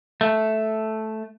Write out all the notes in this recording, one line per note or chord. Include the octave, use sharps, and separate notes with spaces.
A3